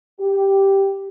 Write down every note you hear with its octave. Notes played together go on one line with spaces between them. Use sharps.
G4